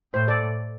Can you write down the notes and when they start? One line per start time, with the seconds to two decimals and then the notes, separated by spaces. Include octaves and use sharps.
0.13 A2 C5
0.28 A4 D5